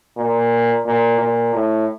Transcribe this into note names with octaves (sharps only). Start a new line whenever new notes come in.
A#2
A#2
A#2
A2